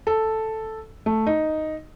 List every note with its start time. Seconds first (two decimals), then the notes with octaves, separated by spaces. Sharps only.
0.07 A4
1.06 A3
1.27 D#4